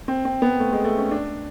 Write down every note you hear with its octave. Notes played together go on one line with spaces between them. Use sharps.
C4
C4
B3
A3
G#3
A3
C#4
D4